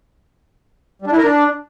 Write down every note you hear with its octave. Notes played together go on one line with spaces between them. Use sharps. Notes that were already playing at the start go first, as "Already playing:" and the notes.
G3
D4
E4
A#4
D4